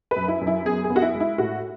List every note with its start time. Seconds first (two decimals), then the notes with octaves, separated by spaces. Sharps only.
0.11 B4
0.16 F#2
0.28 E4
0.41 F#2
0.47 E4
0.65 B3 G#4
0.84 G#4
0.90 B3
0.96 F#4
1.02 E4
1.15 G#3
1.20 E4
1.38 A2 F#4